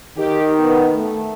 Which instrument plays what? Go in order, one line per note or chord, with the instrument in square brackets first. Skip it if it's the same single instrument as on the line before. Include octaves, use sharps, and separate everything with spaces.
[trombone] D#3 [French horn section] G4
[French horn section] B3
A3